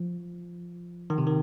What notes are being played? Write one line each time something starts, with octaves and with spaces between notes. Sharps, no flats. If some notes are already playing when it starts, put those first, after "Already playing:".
Already playing: F3
D#3
C3
D#3